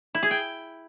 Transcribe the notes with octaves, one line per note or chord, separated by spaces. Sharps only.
E4
G#4
G5